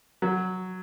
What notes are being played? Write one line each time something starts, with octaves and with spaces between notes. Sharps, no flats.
F#3